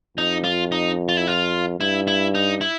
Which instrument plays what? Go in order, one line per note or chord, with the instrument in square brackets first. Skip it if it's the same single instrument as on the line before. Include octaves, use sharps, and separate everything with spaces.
[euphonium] F2 [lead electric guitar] D#4
[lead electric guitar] F4
D#4
F4
E4
F4
[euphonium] G2 [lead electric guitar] E4
[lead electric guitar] E4
D#4
E4